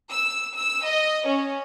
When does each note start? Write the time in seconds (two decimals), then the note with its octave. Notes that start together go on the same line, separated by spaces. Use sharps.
0.11 E6
0.56 E6
0.87 D#5
1.28 C#4